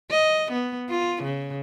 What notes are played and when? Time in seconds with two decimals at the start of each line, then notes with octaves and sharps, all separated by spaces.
0.11 D#5
0.52 B3
0.89 F4
1.23 C#3